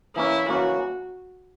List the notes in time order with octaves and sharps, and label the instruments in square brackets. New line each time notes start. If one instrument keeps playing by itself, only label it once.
[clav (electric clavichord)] E3 A#3 C#4 [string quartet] E4
[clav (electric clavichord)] E3 A#3 C#4 [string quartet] F#4